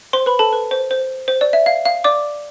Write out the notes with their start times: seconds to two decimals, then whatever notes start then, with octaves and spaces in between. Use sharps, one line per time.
0.13 C5 C6
0.26 B4 B5
0.39 A4 A5
0.53 B4
0.71 C5
0.91 C5
1.28 C5
1.41 D5
1.53 E5
1.66 F5
1.85 F5
2.04 D5 D6